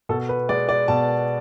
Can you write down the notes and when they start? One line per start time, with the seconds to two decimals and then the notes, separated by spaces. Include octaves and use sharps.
0.09 B2 A4
0.29 B4
0.49 G#3 D5
0.69 D5
0.88 B2 A5